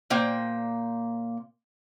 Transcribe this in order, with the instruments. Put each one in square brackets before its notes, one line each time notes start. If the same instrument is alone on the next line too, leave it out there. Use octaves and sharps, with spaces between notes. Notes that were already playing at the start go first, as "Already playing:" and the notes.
[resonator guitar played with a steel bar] A#2 A#3 C5 G5